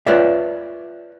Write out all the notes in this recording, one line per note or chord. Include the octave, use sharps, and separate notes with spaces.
F4 B4 C#5 D5 E5